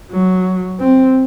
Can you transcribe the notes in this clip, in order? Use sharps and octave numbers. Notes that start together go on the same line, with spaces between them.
F#3
C4